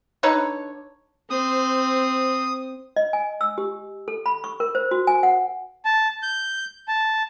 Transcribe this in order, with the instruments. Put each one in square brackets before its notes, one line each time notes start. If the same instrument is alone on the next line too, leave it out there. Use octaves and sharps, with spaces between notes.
[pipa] D3 D#4 B4 C#5
[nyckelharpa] C4 [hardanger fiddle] C5 [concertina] D#6
[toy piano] D#5
G#5
E6
G4
A4
B5
C#6
A#4
C5
F#4
G#5
F#5
[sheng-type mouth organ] A5
G6
A5